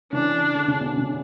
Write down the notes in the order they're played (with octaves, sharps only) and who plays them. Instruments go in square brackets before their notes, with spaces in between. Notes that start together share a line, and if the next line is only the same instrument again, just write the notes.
[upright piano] C#3 E3 [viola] D4
[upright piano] D3
C#3
B2 D3
C#3